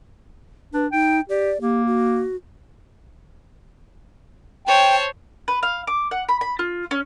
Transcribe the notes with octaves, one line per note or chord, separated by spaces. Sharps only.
D4 B4
D#4 G5
G4 D5
A#3 G4
F#4
C5 C#5 G5 A5
B4
F5
D6
F#5
B5
B5
F4
C#4